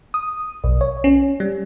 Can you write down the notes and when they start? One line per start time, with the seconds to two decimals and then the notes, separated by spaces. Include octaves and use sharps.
0.14 D#6
0.64 B1
0.81 C#5
1.04 C#4
1.40 G3